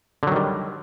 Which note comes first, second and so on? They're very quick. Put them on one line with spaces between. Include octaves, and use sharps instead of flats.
D3 F#3 D#3 G3